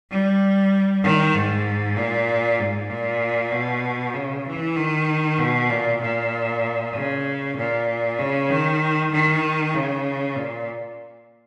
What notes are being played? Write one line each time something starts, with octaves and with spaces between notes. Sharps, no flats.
G3
D#3
G#2
A#2
G#2
A#2
B2
C#3
E3
D#3
B2
A#2
A#2
C#3
A#2
C#3
D#3
D#3
C#3
A#2